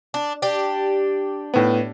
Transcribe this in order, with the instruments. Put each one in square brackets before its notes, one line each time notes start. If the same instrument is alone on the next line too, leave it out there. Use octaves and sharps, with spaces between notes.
[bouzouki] D4
D4 G4
[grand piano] A2 B3